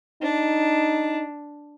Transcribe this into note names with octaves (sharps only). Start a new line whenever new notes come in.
D4 D#4